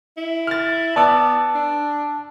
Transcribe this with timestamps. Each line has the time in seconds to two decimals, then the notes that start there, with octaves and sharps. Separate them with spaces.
0.17 E4
0.47 F6 A6
0.96 B3 D5 A5 D6 E6
1.55 D4